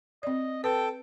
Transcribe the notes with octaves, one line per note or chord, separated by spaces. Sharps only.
C4 D5 D#5
A4 B4 G5